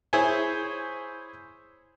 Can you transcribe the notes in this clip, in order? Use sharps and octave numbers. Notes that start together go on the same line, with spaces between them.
E4 G#4 C5 C#5 G#5